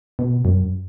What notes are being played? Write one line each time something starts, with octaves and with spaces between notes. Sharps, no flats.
B2
F#2